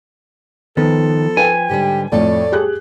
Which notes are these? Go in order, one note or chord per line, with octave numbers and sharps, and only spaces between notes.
D#3 F3 B3 A4
B4 G5 G#5
G#2 D3 G3 G4
F2 A2 A3 A4 C#5 D5
G4 G#4 F#6